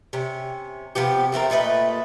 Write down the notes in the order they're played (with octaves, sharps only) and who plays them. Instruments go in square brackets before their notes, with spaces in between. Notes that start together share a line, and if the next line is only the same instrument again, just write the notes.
[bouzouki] C3 C#4
C3 F3 B3 G4
A3 C4 F4 A#4
A#2 A3 B4 D#5